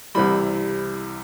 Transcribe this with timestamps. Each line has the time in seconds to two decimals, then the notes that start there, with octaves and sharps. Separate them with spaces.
0.15 C2 C3 E3 G3 B5